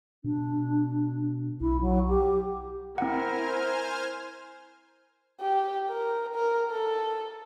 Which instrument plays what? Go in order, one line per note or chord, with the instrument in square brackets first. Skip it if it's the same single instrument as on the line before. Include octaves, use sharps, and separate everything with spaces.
[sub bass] B2 [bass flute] D4
[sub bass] B1 [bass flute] E4
[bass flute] F#3
G4
[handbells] C4 F#5 [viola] E4 A#4 [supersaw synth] C5 G#5 F6
[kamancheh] G4
A#4
A#4
A4